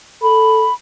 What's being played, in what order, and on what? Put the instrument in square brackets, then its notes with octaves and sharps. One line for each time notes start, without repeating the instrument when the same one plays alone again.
[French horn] A4 [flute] B5